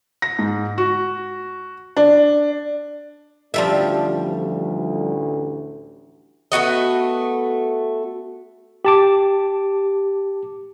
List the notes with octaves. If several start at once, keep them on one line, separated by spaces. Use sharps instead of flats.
A#6
G#2
F#4
D4
A1 D2 F3 G3 A3 E5
A3 B3 F#4 D#5
G4 A5 D6